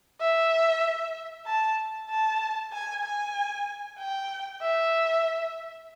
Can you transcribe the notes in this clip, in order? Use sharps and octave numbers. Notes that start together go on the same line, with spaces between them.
E5
A5
A5
G#5
G#5
G5
E5